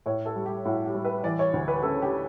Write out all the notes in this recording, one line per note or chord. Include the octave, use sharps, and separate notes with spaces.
A2 C#5
A4
G3
G4
A2 F#4
G4
G3
B4
E3 D5
C#5
D2
B4
C#3 A4
G4